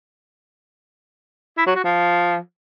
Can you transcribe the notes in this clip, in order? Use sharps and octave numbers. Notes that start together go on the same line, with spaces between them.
E4
F#3
F#4
F3